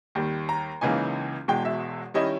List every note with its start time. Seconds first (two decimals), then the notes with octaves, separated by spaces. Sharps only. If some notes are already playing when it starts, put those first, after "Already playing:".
0.15 D#2 D#3 G3
0.49 A#5
0.81 C#2 C#3 E3 A#3 D#4 G#5
1.48 E1 E2 B2 G#3 G5
1.65 E5
2.14 D#3 G3 C#4 E4 D#5